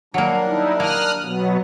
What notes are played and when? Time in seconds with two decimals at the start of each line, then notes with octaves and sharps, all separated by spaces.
0.14 F#3 G3 A#3 D4 A#4
0.46 D#4 E4
0.80 A#3 D#6 F6 F#6
1.22 B2 F#3 B3